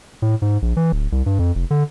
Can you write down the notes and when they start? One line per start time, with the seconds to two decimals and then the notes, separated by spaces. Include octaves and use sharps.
0.22 A2
0.42 G#2
0.62 A#1
0.76 E3
0.92 D1
1.12 C2
1.26 G2
1.39 F2
1.55 F1
1.70 D3